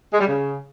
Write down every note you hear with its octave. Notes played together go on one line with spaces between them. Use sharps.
G#3
G3
C#3